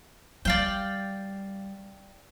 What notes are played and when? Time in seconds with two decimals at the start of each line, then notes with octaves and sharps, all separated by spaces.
0.45 G3 D5 F5 G5